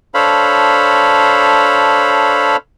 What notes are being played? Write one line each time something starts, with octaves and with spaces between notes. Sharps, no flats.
D4 A4 C5 C#5 F5 B5